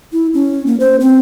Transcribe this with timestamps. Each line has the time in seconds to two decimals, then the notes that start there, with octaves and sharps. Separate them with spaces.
0.13 E4
0.34 C#4
0.66 A#3
0.80 C5
1.00 C4